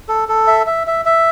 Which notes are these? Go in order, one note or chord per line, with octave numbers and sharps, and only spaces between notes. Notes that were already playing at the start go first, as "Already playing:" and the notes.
A4
A4
E5
E5
E5
E5